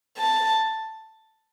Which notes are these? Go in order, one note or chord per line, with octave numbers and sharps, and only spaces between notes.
A5